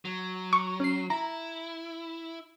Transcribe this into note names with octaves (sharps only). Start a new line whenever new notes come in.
F#3
C#6
C#4 C7
E4 A#5